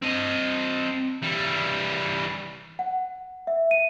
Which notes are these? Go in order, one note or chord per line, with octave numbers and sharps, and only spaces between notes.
C4 D#5
E3 G3
F#5
E5
D#7